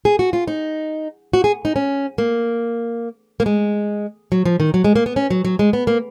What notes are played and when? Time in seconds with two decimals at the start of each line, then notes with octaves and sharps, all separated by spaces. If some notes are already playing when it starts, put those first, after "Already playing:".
0.05 G#4
0.19 F#4
0.33 F4
0.47 D#4
1.33 F#4
1.44 G#4
1.65 D#4
1.76 C#4
2.18 A#3
3.40 A#3
3.46 G#3
4.32 F#3
4.45 F3
4.60 D#3
4.74 F#3
4.84 G#3
4.96 A#3
5.06 B3
5.16 C#4
5.30 F#3
5.45 F#3
5.59 G#3
5.73 B3
5.87 A#3